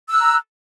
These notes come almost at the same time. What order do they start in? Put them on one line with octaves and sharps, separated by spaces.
E6 F#6 A#5